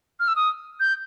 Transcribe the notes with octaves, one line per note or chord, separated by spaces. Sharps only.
F6
E6
D#6
G6